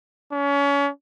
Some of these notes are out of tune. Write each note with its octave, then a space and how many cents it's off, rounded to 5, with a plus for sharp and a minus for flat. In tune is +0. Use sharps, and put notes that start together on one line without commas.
C#4 +30